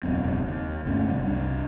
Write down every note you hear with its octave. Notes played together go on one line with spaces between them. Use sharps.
E1 C#2 F#2 C4
D#2
G1 C#2 A3 C#4
F#1 C3 G3
C2 D4